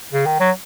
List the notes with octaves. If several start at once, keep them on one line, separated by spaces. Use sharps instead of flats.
C#3
D#3
F#3